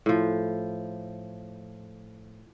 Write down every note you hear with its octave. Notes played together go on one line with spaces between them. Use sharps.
A2 F3